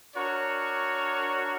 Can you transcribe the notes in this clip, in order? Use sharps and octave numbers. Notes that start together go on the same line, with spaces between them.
D4 F#4 A#4 C#5